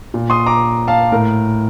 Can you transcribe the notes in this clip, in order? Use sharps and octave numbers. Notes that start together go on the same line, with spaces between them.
A#2
C6 D#6
A#5 D6
F5 A5
A2 A#4